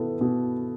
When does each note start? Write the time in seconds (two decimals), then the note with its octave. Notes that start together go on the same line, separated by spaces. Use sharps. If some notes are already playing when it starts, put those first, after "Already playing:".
Already playing: B2 B3 E4 A4
0.21 B2